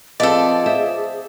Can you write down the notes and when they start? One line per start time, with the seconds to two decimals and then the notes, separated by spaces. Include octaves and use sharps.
0.20 F3 B3 C4 G#4 A4 D5 D#5 F5
0.66 C5 E5